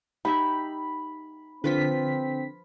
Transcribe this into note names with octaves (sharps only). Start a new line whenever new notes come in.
D#4 G4 E5 B5
D3 F3 C4 F4 B4 B6